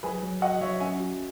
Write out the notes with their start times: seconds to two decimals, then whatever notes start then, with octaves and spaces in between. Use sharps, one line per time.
0.03 F#3 G#4 B4
0.23 F#3
0.42 F#4 D#5 F#5
0.61 F#3 C#5 E5
0.80 C#4 E5 G#5
1.00 F#4